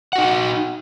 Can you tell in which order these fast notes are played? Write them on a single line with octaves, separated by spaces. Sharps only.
F#5 F#4 D#4